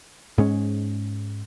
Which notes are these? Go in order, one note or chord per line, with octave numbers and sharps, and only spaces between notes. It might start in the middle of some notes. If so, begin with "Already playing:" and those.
G#2 G#3 C#4